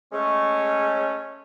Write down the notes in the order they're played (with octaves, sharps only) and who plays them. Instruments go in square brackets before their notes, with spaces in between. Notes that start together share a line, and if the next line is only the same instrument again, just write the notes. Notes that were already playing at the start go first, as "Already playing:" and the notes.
[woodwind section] G#3 A3 C#4